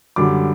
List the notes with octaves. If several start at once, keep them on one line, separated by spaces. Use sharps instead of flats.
F#2 D3 G3 D6